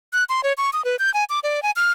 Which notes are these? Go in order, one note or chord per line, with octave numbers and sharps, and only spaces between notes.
F#6
C6
C#5
C#6
D#6
B4
G6
G#5
D6
D5
G#5
F6